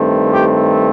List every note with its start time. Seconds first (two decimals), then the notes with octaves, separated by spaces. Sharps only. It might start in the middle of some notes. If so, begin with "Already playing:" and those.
Already playing: G2 D#3 A3 C4
0.32 G4